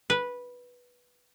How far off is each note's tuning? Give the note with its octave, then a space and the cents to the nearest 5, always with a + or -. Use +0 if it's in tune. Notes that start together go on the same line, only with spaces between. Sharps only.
B4 -10